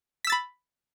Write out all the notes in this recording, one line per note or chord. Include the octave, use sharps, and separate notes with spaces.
B5 E6 A6 B6